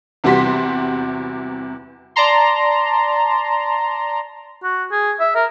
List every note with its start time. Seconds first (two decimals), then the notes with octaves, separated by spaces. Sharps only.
0.24 E2 C3 G3 F#4 C6 B6
2.16 D5 A5 A#5 C6
4.63 F#4
4.92 G#4
5.20 E5
5.36 A#4